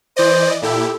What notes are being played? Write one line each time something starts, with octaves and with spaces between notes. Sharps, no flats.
E3 C5 D5 D#5
A#2 E4 G4 A4